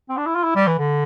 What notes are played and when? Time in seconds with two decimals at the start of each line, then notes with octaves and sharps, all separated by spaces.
0.09 C4
0.17 D4
0.26 E4
0.35 F4
0.44 E4
0.56 G3
0.67 E3
0.79 D3